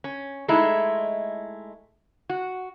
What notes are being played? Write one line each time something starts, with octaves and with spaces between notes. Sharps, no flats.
C#4
G#3 A3 D#4 E4
F#4